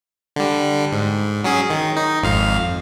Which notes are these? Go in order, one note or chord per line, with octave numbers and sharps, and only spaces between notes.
D3 G3
G#2
F#3 C#4 G#4
D#3
D#4
G#1 F2 F5